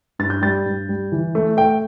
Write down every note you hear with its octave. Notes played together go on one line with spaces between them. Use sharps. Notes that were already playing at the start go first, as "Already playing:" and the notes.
G2 A6
G6
G3 A6
G2
G3
E3
A3
A3 G5